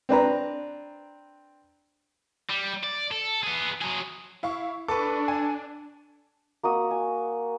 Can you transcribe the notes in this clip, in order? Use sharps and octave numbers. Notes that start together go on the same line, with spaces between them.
C4 D4 B4 A#5
G3
D5
A4
B3 G#4
F#3 G#4
E4 F5 C#6
D4 A4 B4 C#6 D6
G#5
A#3 F#4 D#6
G#5